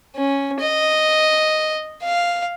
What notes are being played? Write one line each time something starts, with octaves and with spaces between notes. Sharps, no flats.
C#4
D#5
F5